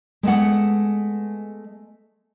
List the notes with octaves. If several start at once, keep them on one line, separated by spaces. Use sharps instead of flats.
G#3 A3 B3 F#5